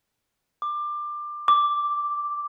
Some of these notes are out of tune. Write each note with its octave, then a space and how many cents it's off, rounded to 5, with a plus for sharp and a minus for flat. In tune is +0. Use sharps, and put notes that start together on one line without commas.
D6 +20
D6 +0